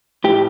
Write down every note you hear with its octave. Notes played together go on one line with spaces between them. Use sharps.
A2 G4